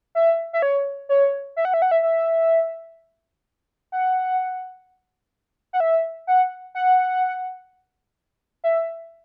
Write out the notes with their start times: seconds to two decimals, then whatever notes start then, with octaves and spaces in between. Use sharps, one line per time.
0.15 E5
0.53 E5
0.62 C#5
1.09 C#5
1.56 E5
1.65 F#5
1.74 E5
1.82 F#5
1.91 E5
2.03 E5
3.92 F#5
5.73 F#5
5.80 E5
6.27 F#5
6.75 F#5
8.64 E5